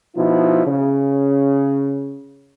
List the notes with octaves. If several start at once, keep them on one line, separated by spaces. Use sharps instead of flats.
B2 F3 D#4 E4
C#3